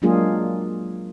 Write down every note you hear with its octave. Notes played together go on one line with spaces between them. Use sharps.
F#3 G#3 A#3 D4 F4 G#4